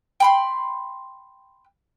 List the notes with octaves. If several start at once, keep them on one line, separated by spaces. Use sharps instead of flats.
G5 B5 C6